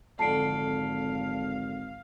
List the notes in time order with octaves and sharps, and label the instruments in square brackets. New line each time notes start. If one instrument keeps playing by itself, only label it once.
[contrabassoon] G#1 [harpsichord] F2 D3 [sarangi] F5 [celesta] A5 C7 D7